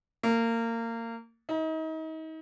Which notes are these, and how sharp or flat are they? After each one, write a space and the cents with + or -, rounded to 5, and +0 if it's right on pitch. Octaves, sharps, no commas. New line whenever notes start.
A#3 -25
D#4 +35